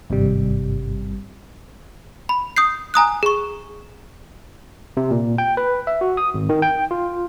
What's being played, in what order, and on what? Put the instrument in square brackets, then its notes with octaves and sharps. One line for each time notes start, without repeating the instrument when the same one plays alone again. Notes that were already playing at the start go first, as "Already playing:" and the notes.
[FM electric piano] G#1 G2 C3 G3
[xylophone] B5
D#6 G6 C7
G#5 A#5 D#6 F#6
G#4 C#6
[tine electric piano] C3
A#2
G5
B4
E5
F#4
D#6
G#1
D#3
G5
F4